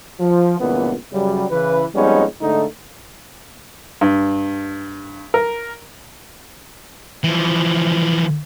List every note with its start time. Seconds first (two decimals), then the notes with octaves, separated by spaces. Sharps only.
0.19 F3
0.59 C#2 G2 A#2 E3 B3
1.12 F#2 C#3 F#3 G3
1.51 C#3 E3 B4
1.95 F2 G3 G#3 B3 C#4 D#4
2.41 G#2 D3 A3 D#4
4.01 G2
5.34 A#4
7.24 E3 F3